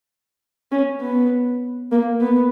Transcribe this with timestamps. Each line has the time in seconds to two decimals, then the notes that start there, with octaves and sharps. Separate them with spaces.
0.72 C#4
1.02 B3
1.92 A#3
2.21 B3